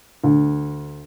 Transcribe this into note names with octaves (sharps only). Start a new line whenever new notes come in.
D2